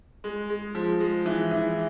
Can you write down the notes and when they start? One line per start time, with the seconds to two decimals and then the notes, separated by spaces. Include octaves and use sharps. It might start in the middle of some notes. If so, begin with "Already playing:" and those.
0.24 G#3
0.50 G#3
0.75 F3
1.00 G#3
1.26 E3
1.51 E3